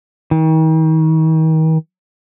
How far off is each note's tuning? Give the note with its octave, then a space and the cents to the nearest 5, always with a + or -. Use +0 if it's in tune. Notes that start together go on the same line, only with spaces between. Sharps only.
D#3 +40